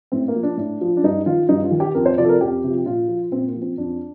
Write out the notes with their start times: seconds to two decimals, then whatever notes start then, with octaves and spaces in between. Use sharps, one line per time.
0.12 A2 C4
0.28 A#3
0.35 F3
0.43 D4
0.57 A2 D4
0.81 F3
0.97 D4
1.04 G2 D#4
1.26 D#3 F4
1.49 G2 D#4
1.64 F4
1.71 D#3
1.80 G4
1.95 F2 A#4
2.06 C5
2.18 C3 F3 D5
2.25 A4
2.29 A#4
2.41 F2 G4
2.64 C3 F3
2.85 A#2 F4
3.08 F3
3.31 A#2 C4
3.47 A#3
3.54 F3
3.62 C4
3.77 F2 D4